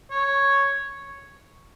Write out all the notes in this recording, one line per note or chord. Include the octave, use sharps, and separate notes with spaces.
C#5